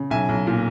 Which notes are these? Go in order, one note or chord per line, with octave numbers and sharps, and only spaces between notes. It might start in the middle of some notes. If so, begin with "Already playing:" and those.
Already playing: C#3
B1 E5 G#5
B1
A#2